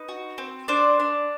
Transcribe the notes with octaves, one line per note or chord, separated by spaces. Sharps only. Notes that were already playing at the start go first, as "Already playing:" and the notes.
Already playing: D#4 B4
F#4
C4
D4 C5 D5
D4